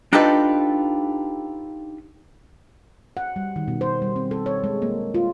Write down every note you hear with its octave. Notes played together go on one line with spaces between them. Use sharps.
D4 D#4 F4 G4 A4 B4
F#5
G3
D#3
B2
C5
G3
C4
A4
C#5
G#3
A#3
F4